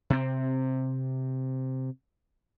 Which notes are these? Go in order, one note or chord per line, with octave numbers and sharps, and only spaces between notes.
C3 C4